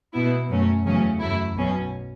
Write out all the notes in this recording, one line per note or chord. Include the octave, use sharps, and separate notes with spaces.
B2 B3 E4
F#2 F#3 A3 C#4
E2 C#3 F#3 A3 C#4
F#2 F#3 A3 E4
B1 B2 F#3 C#4